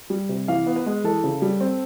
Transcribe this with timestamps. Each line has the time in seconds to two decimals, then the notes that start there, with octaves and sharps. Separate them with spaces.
0.10 G3
0.29 C3
0.48 E3 F5
0.67 B3
0.76 B4
0.86 G#3
1.04 E3 A4
1.24 C#3
1.42 G3
1.60 C4